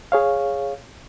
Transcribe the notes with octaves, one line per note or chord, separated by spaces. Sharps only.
G#4 C#5 F5